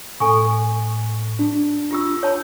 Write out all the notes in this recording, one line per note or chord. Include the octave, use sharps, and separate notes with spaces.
A2 A4 G#5 C#6
D4
F4 G4 E6
C#5 A5 B5